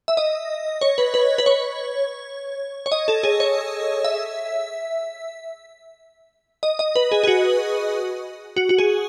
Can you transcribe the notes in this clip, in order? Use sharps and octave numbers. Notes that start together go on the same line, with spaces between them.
E5
D#5
C#5
B4
B4
B4
C#5
C#5
D#5
A4
G#4
C#5
E5
D#5
D#5
B4
G#4
G#4
F#4
F#4
F#4
G#4